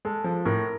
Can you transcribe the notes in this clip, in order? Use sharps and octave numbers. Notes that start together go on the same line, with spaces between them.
G#3 A4
F3
A2 A#4